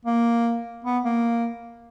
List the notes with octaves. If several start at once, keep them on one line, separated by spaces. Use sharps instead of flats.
A#3
B3
A#3